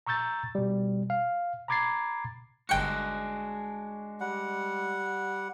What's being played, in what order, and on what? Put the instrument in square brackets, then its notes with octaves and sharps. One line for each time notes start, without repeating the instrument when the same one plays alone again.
[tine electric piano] A#5 C#6 E6 G6 A6
B2 G3
F5
A#5 B5 D6 G#6 A6 C7
[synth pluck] G1 G5 C#7 [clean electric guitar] G#3 D4 F#4
[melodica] G3 F#5